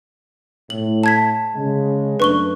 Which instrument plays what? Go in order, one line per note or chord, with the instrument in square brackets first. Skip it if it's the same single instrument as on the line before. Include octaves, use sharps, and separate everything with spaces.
[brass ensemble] A2 [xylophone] F#7
[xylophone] A5 G#6 B6
[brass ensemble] C#3 G#3
[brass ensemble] F#2 A3 D4 [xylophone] B4 C#6 G7